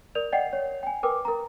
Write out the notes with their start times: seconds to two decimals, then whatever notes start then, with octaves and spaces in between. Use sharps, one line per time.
0.15 A#4 D5 F7
0.32 D5 D#5 F#5 G5 C7
0.53 C#5
0.83 G5 G#5
1.03 A#4 B4 G5 D6
1.25 A#4 A#5